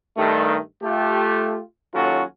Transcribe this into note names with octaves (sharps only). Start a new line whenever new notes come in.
G2 D#3 A3
A3 F4 G4
D#2 F#3 C#4 F4 F#4 A4